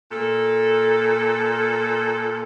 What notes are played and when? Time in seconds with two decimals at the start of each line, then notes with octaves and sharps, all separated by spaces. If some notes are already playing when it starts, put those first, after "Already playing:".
0.11 A#2 A4